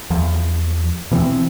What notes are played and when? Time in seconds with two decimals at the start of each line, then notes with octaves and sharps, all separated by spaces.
0.10 E2 F3
1.11 B2 E3 F3 C4